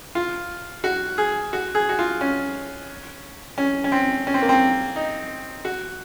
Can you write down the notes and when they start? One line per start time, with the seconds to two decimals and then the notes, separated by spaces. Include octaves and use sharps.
0.15 F4
0.84 F#4
1.18 G#4
1.53 F#4
1.75 G#4
1.89 F#4
1.99 F4
2.21 C#4
3.58 C#4
3.84 C#4
3.92 C4
4.27 C#4
4.34 C4
4.42 A#3
4.49 C4
4.96 D#4
5.65 F#4